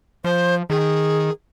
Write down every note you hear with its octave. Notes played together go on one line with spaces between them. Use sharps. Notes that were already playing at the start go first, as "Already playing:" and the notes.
F3 C5
D#3 G#4